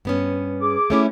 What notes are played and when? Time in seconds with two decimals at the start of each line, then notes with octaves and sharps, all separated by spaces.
0.05 G2 B3 C#4
0.61 G#4 D6
0.90 A3 C#4 E4